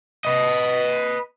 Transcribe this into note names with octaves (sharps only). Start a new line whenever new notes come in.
B4 D#5